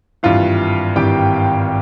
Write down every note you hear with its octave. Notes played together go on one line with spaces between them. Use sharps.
G#1 G2 E3 F4 F5
G#1 G2 E3 G4 G5